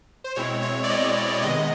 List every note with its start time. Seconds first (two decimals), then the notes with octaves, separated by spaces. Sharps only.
0.24 C5
0.36 B2 G#3 C4 E4 C#5
0.62 C#5
0.84 D5
0.90 B2 G#3 C4 E4 D#5
1.42 C3 D#3 G#3 B3 D#5